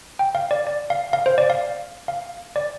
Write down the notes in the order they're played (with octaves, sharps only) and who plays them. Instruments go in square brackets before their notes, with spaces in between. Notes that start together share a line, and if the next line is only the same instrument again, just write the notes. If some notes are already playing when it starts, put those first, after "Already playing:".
[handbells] G5
F5
D5
D5
F5
F5
C5
D5
F5
F5
D5